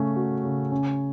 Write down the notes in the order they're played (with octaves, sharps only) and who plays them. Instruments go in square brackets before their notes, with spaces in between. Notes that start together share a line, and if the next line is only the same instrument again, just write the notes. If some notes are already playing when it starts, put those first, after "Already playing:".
Already playing: [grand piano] C#3 A3 C#4
F#4
C#3
C#4